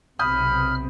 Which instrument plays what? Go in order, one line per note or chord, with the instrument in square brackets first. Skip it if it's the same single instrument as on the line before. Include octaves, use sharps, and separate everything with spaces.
[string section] B1 C3 [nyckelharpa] B5 [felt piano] D#6 G6 [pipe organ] F6